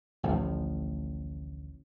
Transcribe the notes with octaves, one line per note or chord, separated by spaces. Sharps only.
A1 D2 A2 F3